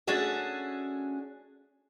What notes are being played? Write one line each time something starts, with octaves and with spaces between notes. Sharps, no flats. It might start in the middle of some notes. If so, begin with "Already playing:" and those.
A3 C#4 D4 F#4 G#4 E5